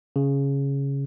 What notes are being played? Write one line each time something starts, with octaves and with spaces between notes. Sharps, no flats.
C#3